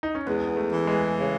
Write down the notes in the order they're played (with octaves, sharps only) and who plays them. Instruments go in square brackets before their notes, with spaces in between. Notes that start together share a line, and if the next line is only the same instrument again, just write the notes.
[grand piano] D#4
C#4
[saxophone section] E2 [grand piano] G#3 B3
[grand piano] B3
A3
[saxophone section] E3
[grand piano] G#3 B3
[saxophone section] C#3